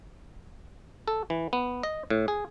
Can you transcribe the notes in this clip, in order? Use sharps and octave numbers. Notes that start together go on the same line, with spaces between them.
A4
E3
B3
D#5
A2
G#4